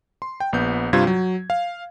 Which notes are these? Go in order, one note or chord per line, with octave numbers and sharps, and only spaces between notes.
C6
G5
A#1 B3 G6
G2 C3 G3 F4 G#6
F#3
F5